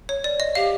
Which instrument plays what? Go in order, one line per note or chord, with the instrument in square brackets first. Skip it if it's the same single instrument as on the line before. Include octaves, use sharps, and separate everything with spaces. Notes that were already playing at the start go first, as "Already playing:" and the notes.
[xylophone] C#5
D5
D#5
[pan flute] G4 [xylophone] F5